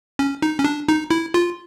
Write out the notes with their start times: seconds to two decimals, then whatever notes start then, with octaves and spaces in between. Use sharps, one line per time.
0.19 C#4
0.42 D#4
0.59 C#4
0.64 D4
0.88 D#4
1.11 E4
1.34 F4